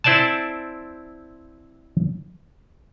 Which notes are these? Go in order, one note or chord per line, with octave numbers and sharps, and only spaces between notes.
C4 E4 C5 D5 G#5 A5